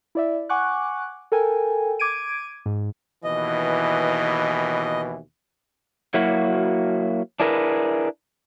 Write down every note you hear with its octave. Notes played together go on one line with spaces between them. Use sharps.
E4 D5 E5
F#5 G#5 C#6 D6 F#6
A4 A#4 G5 G#5
D6 G#6 D7 D#7
G#2
D#2 B2 E3 D#5
F#3 A#3 E4 F#4
D4 E4 G#4 A#4 B4